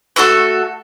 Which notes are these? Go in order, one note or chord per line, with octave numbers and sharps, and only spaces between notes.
A3 F#4 A4 C#6